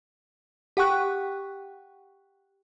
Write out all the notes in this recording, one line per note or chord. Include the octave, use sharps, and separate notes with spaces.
G4 F#5 G5 C#6 F#6